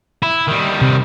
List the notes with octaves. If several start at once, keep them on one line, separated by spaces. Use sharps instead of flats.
E4
D#3 G3
C3